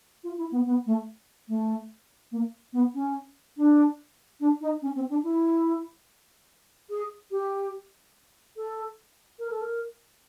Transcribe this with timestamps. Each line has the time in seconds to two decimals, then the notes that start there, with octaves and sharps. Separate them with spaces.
0.23 F4
0.37 E4
0.51 B3
0.65 B3
0.85 A3
1.48 A3
2.31 A#3
2.72 B3
2.94 C#4
3.57 D4
4.40 D4
4.60 D#4
4.81 C#4
4.95 C4
5.09 D4
5.23 E4
6.89 G#4
7.30 G4
8.56 A4
9.39 A#4
9.50 A4
9.61 A#4